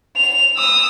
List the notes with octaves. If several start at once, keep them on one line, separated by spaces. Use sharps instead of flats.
F7
D#6 E6